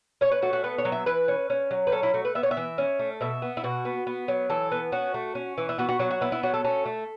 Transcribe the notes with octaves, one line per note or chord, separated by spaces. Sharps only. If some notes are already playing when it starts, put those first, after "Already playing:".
C#4 C#5
B4
A3 F#4
F#4
B3 B4
C#5
F#3
E5
E3 B4
C#4
C#4
F#3
B4
C#4 A4
E4
A3 F#4
B4
B3 E5
C#5
E5
E3
C#4
A3
B2 E5
B3
E4
B2 F#4
B3
B3
F#3
E3 A4
B3
C#4 F#4
A3
C#4
E3
E4
B3 F#4
F#4
F#3 F#4
F#4
B3 E4
E4
F#3 F#4
A4
C#4 A4
A3